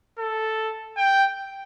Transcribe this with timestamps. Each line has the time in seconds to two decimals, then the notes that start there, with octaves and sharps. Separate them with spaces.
0.18 A4
0.96 G5